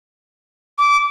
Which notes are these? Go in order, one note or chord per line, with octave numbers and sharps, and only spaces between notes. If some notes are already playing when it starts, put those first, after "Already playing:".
D6